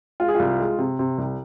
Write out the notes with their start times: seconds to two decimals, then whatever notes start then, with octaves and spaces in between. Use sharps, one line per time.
0.20 G#3 F4
0.28 G#4
0.35 C2 F4
0.60 G#3
0.78 C3
0.99 C3
1.18 C2